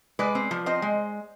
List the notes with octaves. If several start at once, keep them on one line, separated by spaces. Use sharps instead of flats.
G#3 B4 D5
C4
F3
C4 C5 D#5
G#3